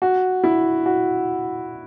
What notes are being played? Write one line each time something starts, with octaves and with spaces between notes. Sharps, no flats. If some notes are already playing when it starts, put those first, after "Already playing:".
F#4
E4
F#4